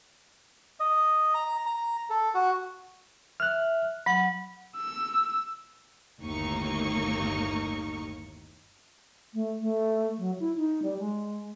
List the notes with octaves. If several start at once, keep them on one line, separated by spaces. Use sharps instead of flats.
D#5
A#5
A#5
A4
F#4
E5 F6 F#6
F#3 F#5 B5
E6
G1 D#2 A2 A#3 D#4 C#6
A3
A3
F#3
E4
D#4
G3
G#3